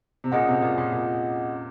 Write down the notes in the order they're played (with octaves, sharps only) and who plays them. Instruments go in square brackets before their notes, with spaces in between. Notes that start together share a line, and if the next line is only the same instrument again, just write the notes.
[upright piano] C3
[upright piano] A#2 [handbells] C#4 G#4 D#5 F#5
[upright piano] C3
A#2
A#2
A#2